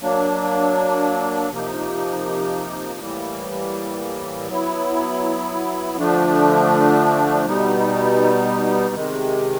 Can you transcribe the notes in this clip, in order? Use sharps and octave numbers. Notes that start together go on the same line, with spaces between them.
F#3 A#3 D4
C3 F3 A#3 D#4
A2 E3 G3 A#3
F#3 B3 E4
D3 F3 A3 D4
B2 G3 B3 D#4
C3 D#3 G#3